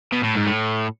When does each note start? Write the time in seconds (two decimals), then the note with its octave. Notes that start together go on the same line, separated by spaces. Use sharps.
0.12 B2
0.23 A2
0.35 G#2
0.46 A2